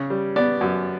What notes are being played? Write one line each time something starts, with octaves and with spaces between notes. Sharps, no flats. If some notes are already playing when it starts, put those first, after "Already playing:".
Already playing: C#3
G3
B3 D5
F#2